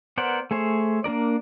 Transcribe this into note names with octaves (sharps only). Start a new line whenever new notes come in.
B3 A#4 C5 D5 F#5
A3 G#4 C5 C#5
A#3 D4 A#4 D5